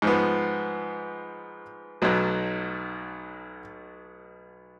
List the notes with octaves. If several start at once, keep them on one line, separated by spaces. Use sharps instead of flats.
G#2 F3 B3
B1 B2 F#3